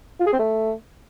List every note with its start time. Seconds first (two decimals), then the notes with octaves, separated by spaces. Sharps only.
0.20 F4
0.27 G#4
0.33 C4
0.39 A3